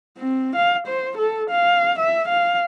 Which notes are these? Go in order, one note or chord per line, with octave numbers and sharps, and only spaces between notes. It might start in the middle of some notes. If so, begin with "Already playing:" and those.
C4
F5
C5
A4
F5
E5
F5